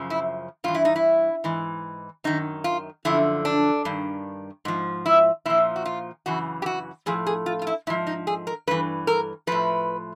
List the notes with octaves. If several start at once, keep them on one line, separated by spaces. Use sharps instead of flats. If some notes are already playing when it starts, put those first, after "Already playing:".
Already playing: F#2 C#3 F3
E4
G2 E3 F4
E4
D#4
E4
G#2 E3
F#2 D#3 D#4
F4
F#2 D3 F3 E4
D4
G2 D#3
G#2 F3
E4
A#2 F3 E4
F#4
F4
F#2 C#3 E3 F#4
G4
F#4
A2 F3 G#4
G#4
F4
F4
E4
G#2 F3 E4
D#4
G#4
A#4
G2 E3 B4
A#4
A2 F3 B4